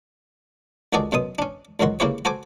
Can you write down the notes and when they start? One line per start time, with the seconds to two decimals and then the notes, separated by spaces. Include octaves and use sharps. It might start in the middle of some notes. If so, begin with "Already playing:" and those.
0.93 C#2 D#3 F#4 G#4 A4 D5
1.12 F#2 B2 C6 D#6
1.39 C#4 D4
1.80 C#2 F#2 D#3 F#4 C6
2.00 C#3 A#3 E4 G4 B4 C#5
2.25 F#4 A4 C5 G#5 D6